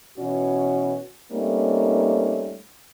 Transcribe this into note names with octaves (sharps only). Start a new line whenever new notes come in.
B2 E3 C#4 F#4
G3 A3 A#3 C4 C#4 D#4